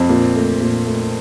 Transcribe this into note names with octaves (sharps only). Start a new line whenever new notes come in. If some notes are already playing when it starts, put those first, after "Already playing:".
Already playing: F2 C4
A#2
A3
A#2
A3